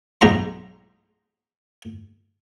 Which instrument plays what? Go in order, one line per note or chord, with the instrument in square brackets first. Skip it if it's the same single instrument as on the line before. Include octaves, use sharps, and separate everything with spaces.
[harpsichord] B1 G#2 A#5 C6